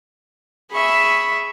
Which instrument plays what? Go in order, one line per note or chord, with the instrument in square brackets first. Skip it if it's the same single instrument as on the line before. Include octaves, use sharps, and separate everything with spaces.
[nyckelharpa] G#4 E5 [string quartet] B5 C#6